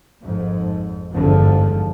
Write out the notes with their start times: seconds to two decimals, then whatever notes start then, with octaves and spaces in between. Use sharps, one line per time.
0.24 G#1 F2 G#2
1.12 G#1 E2 G2 D3 F3